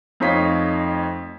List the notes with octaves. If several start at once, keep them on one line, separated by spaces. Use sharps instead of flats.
F2 A3 D#4 C#5 F5 B6